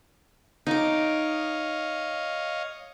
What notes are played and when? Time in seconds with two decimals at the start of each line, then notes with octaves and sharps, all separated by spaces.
0.67 D#4 C#5 D#5 F5 D6